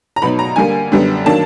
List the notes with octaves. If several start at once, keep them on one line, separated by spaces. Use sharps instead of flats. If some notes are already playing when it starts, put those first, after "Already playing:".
A#5
B2 F#3 B3 D#4 B5
A#5
D3 G3 A#3 G#5
F#2 D3 G3 B3
D#3 F#3 A#3 D4 A5